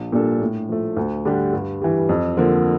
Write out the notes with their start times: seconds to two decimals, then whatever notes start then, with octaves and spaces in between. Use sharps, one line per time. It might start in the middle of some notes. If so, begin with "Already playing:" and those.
Already playing: A#1
0.12 A#2 G3 D4 A4
0.41 A2
0.69 F3 A3
0.97 D2
1.25 D3 G3 D4 G4
1.53 G2
1.82 E3 G3
2.09 F2
2.37 D3 F3 A#3